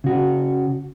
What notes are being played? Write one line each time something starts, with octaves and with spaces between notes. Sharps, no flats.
C#3 F#4